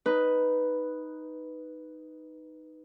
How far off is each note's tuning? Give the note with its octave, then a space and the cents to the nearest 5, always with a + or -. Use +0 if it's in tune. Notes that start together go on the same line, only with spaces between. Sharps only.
D#4 +0 B4 +0